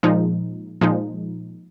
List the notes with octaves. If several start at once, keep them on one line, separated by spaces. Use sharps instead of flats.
A#2 F3 G#3 D#4
A#2 F3 G#3 D#4